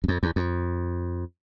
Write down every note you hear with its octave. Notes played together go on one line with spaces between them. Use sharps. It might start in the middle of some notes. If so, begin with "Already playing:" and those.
F#2
F2
E2
F2